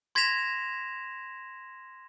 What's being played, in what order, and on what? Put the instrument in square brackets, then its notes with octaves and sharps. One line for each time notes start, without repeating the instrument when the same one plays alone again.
[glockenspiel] C6 G#6 A#6 B6 E7 F7